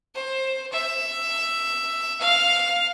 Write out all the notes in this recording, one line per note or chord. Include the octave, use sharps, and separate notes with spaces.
C5
E5
F5